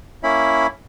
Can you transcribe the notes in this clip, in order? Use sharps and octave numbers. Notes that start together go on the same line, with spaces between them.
A#3 C#4 E4 B5